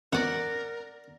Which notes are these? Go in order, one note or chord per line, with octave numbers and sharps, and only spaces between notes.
A1 F2 B2 A#4 D5 F#5